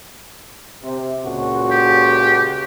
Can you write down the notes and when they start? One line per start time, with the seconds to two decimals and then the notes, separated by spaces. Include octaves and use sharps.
0.83 C3
1.24 C#2 A#2 F#4
1.71 G4